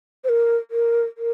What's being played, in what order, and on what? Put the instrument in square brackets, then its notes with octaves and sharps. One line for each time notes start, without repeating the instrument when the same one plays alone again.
[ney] C5
A#4
A#4
A#4